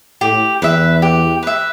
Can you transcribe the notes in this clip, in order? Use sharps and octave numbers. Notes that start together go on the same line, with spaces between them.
A2 G4
E2 B4 E5
G4
B4 E5